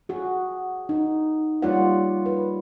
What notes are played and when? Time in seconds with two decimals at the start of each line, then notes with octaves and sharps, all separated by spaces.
0.09 F#4 G#4
0.89 D#4
1.62 G3 A#3 F4 C#5 D5 F#5
2.26 B4